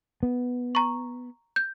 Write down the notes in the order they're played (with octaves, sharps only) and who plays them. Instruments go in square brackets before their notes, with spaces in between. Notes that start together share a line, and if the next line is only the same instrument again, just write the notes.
[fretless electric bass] B3
[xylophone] A#5 C#6
G6